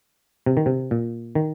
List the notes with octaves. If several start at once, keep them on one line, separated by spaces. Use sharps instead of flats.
C3
D#3
C3
A#2
D#3